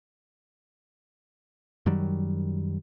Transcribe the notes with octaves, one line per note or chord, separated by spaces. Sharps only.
F#2 D#3 F#3 G3